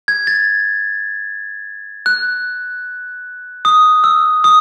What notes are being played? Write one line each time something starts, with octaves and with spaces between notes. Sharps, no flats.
G#6
A6
F#6
D#6
E6
D#6